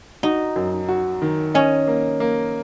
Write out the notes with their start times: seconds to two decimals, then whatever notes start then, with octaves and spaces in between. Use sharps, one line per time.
0.23 D#4 F#4
0.56 F#2
0.89 F#4
1.22 D#3
1.54 C#4 D#5
1.87 A#3
2.20 A#3